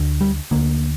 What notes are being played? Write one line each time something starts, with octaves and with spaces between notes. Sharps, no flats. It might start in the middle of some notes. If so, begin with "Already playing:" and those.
Already playing: D2 D3
G3
D2 D3 A#3